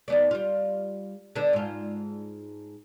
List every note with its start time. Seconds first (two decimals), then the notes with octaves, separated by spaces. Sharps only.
0.08 D#2 B3 D5
0.31 G3 F4
1.36 D3 B3 D4
1.53 G#2 F4